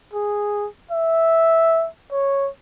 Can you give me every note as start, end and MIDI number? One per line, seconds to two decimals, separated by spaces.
0.13 0.67 68
0.91 1.87 76
2.12 2.48 73